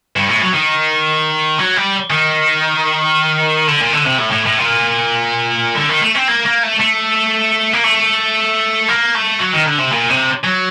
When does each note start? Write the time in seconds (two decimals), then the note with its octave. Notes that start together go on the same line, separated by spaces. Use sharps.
0.16 G2
0.29 A2
0.42 F#3
0.54 D#3
1.59 F#3
1.76 G3
2.10 D#3
3.68 D3
3.81 A#2
3.93 D3
4.06 C3
4.19 A2
4.32 A2
4.46 A2
4.58 A#2
5.75 D3
5.89 D#3
6.01 A3
6.15 C4
6.28 A#3
6.45 A#3
6.63 A3
6.80 A3
7.73 A#3
7.84 A3
8.88 A#3
9.15 A3
9.40 F#3
9.54 D#3
9.66 D3
9.79 C3
9.92 A#2
10.10 C3
10.44 F#3